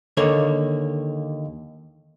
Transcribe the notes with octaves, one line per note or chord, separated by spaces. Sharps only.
D#2 D3 A#3 C#5